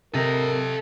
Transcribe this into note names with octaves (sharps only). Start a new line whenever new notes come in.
C3 A4 A#4 D#5